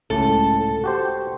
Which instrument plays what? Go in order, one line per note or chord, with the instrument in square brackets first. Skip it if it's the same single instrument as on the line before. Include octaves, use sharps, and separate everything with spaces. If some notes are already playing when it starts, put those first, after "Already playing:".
[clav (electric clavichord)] C#2 A2 [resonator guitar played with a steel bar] A4
[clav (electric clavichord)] F#4 G4 C5